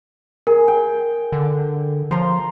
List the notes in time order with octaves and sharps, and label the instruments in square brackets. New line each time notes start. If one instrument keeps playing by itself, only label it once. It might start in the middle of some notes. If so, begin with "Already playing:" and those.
[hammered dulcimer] G#4 [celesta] A#4
[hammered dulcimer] G5
[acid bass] D3
[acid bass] F3 [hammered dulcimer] A#5 C6